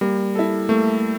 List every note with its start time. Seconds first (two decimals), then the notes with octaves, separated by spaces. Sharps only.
0.01 G3 A#3
0.35 E4 A4
0.69 A3 A#3